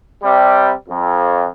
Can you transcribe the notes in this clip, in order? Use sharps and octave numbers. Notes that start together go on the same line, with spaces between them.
C3 G3
F2